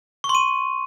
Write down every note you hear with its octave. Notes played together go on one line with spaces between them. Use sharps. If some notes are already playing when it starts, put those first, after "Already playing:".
C#6
C6
D#7